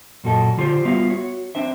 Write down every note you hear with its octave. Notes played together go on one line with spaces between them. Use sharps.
F#2 A#2 F#4 A4 D#5 A5
D3 F4 G4 B4 C5
G3 B3 F4 F#4 E5 F5
F#4 C#5
C4 D4 C5 E5